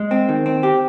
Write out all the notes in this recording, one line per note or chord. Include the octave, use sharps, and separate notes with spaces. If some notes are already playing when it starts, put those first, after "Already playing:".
Already playing: G#3
C4
D#3
C4
G4